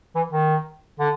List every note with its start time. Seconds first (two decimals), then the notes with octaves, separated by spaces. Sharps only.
0.15 E3
0.31 D#3
0.99 D3